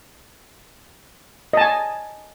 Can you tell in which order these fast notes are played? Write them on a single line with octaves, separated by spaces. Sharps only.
D#5 A5 G#5